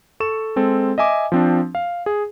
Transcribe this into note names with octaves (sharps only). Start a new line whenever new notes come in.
A4 C#6 E7
G#3 C4 A4
D#5 E5 G#5 D6
F3 C4 D4
F5
G#4